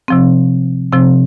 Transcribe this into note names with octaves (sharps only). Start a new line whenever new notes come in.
C3 F3 C4
C3 F3 C4